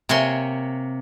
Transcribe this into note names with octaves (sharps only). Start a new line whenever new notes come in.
C3 A#3 C#5 G#5 C6